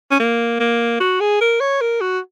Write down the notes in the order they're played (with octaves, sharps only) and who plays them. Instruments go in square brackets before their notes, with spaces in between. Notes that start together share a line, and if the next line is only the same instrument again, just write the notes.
[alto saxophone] C#4
A#3
A#3
F#4
G#4
A#4
C#5
A#4
F#4